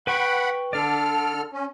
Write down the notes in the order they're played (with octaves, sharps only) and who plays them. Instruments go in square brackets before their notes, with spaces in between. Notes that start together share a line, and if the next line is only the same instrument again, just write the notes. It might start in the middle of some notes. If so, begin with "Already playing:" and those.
[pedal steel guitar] B4 G5 C#6 [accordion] F#5 B5
[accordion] D3 A4 F6 [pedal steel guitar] D4 D5
[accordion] C#4